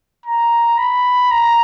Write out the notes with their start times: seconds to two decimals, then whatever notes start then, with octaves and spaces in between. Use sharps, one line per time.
0.26 A#5
0.78 B5
1.31 A#5